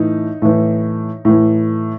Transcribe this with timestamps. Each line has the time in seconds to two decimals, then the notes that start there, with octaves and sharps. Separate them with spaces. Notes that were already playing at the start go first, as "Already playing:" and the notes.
Already playing: A2 E3 D#4
0.42 A2 E3
1.25 A2 E3